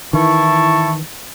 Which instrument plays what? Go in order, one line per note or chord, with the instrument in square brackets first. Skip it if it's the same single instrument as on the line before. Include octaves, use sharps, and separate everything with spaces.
[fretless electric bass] D#3 E3 [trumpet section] E4 A5 C#6